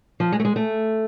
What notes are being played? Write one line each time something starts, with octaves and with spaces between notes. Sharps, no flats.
F3
G#3
A3
G#3
A3